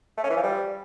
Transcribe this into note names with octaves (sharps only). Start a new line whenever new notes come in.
A3
C#4
E3
F3
G3